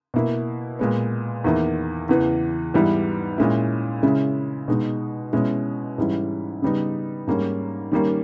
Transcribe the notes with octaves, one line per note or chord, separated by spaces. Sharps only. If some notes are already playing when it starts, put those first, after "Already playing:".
B2 A#3 E4
A#2 G#3 B3
E2 D#3 A#3 E4
E2 C#3 E3
G#2 E3 G3 B3 E4
A#2 G#3 C#4 E4
C#3 G#3 C#4 E4
B2 G#3 D#4
B2 G#3 C#4 E4
G#2 E3 G3 C#4 E4
C#3 G3 B3 D#4
G#2 G3 A#3 C#4
D#3 G3 A#3 C#4